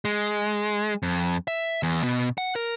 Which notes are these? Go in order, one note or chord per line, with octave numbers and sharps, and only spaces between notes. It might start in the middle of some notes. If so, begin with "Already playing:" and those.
G#3
F2
E5
E2
B2
F#5
A#4